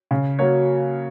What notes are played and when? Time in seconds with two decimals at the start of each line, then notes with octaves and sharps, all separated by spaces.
0.11 C#3
0.39 F#3 A#3 F#4 C#5